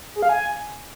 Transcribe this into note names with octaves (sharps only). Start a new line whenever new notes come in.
G#4
F5
G#5